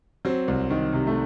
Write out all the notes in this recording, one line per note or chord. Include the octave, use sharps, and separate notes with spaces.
F#3 C4
C2
D#3
C3
A3